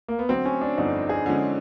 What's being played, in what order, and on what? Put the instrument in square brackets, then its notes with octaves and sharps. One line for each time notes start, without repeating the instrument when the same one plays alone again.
[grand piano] A#3
B3
[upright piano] D3 F#3 A3 [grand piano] C4
[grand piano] C#4
D4
[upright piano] G1 F2 D3 [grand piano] D#4
[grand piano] G#4
[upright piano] D3 F3 G#3 C#4